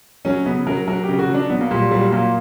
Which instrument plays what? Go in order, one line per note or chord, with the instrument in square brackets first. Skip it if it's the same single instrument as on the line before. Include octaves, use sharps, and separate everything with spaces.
[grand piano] F#3 C#4
C#3 B3
F#3 A#4
F#3 A#4
G4
C#3
F#4
F#3
D4
F#3 B3
A#3
A#2 G3
F#3 G3
A#2 A#3